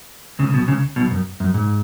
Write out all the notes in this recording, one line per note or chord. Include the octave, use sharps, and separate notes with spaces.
C#2 C#3
B1 B2
C#2 C#3
B1 B2
F#2
F#2
G#2